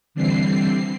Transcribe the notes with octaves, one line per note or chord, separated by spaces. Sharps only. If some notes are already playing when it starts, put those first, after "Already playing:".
D3 E3 G3 C4 C7